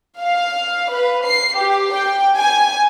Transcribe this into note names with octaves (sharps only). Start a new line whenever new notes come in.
F5
B4
C7
G4
G5
G#5